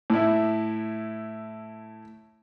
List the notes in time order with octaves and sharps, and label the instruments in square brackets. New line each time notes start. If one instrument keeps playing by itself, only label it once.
[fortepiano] A2 E4